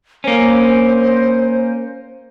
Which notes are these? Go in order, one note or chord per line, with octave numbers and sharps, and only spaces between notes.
A#3 C#4 C5